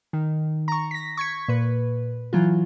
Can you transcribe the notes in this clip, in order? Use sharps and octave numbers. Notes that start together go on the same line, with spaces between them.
D#3
A#5 C#6
A#6 B6
C#6 G#6 B6 C#7
A#2 B4
E3 F#3 F4